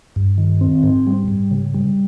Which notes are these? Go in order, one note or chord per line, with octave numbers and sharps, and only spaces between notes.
G2
D#3
C4
G#2
G3
G#2
C#3
G3